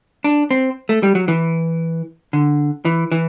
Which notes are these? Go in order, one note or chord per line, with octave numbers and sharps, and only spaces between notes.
D4
C4
A3
G3
F#3
E3
D3
E3
E3